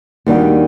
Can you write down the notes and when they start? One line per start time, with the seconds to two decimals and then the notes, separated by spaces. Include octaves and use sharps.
0.27 D#2 D#3 G3 D4 F#4